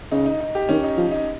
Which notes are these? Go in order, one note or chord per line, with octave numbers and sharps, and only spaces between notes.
C#3 D#4
D#4
D#4
G4
D#3 C#4
D#4
F3
D#4